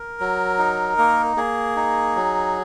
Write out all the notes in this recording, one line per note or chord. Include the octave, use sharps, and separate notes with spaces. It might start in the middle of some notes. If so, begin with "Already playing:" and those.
Already playing: A#4
F#3
D#4
A#3
A#3 G#4
D#4
F#3